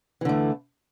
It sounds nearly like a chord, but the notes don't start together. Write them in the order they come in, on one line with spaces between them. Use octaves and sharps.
E3 D3 A3